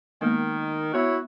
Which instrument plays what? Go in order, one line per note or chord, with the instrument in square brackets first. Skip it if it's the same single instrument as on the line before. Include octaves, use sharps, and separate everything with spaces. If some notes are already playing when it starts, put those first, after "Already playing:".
[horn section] D#3 [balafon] G#3 A#3 B3
[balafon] B3 [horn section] E4 F#4 C#5